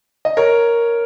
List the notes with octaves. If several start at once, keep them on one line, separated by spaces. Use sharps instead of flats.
D#5
A#4 C#5